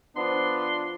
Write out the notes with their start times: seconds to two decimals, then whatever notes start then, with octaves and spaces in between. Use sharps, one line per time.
0.16 F3 B3 D4 C6